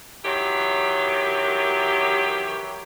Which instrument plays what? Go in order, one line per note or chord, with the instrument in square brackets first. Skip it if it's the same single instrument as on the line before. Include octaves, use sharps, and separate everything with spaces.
[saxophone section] D#3 E3 F#3 G4